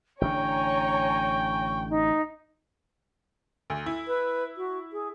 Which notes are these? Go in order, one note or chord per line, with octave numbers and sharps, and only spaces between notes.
A1 D3 D4 C#5 G5 G#5 A#5 C#6
D#4
D2
E4
B4
F#4
G#4